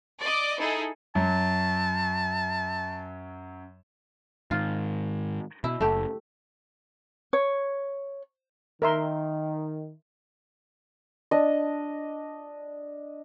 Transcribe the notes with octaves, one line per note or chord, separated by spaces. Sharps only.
D5 D#5 D6
D#4 E4 G#4 A4
F#2 F#3 A5
G#2 D#3 F4
B2 E4
F#1 A3 G4
C#5
D#3 A#4 E5 C6
D4 D#5